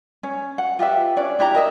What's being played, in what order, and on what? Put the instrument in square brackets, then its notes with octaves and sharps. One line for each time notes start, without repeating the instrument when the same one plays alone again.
[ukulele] C#4
F#5
F4 G4 B4 E5
C#4 D4 D5
D4 E4 G4 A#5
A#4 D#5 E5